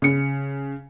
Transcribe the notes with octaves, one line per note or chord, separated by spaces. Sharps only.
C#3 C#7